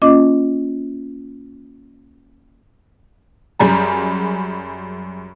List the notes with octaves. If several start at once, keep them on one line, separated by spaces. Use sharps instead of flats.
A#3 C#4 F4 D#5 D6
F#2 G3 G#4 A#5